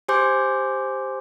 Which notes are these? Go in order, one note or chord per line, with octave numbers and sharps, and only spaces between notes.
G4 C5 G#5 C6 D6 G6